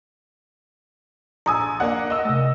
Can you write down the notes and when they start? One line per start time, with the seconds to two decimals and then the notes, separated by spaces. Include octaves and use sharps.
1.46 A#1 G#5 A#5 D#6 E6
1.80 A#3 D4 F#5
2.10 D#5 E6
2.25 C3 A3